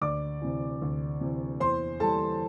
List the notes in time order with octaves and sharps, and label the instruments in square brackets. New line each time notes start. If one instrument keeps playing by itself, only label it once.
[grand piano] D2 D5 D6
C3 E3
D2
C3 E3
E2 C5 C6
E3 G3 A4 A5